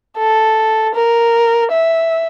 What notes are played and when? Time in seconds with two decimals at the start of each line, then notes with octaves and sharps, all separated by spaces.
0.18 A4
0.94 A#4
1.72 E5